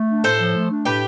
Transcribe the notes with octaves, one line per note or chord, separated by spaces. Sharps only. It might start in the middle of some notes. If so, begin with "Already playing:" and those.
Already playing: A3
D4
A2 A4 C5
F3
A3
D4
A2 G4 B4